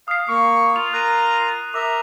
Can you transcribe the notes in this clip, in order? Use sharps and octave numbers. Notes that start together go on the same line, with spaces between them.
F5 D#6 C7
A#3 C#6
F4 F7
A#4 A#5 F#6 D#7
A#4 E5 D6